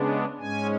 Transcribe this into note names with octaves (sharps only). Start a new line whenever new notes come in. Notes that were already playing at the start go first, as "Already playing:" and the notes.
Already playing: C#3 G#3 B3 D4
G#2 G#3 C#4 G#5